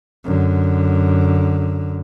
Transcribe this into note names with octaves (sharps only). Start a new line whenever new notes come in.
F#2 D3